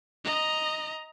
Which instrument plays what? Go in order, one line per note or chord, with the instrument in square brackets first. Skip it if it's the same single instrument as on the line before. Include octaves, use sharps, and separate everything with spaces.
[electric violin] D#5 A#5